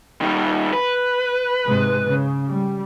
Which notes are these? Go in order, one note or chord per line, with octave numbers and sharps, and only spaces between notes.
D#3 G3
B4
G#2 C3 G#3
C#3
G3